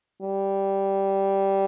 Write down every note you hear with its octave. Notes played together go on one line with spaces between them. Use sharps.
G3